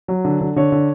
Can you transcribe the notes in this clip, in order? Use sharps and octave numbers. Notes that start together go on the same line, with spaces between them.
F#3
D3
D3
D3 C#5
D3